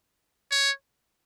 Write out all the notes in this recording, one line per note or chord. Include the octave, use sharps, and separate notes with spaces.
C#5